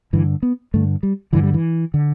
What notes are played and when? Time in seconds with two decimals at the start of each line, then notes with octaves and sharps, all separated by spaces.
0.13 G2 D3 E3
0.43 B3
0.74 G2 D3 A3
1.03 G3
1.33 G2 D3 E3
1.43 G3
1.54 E3
1.94 D3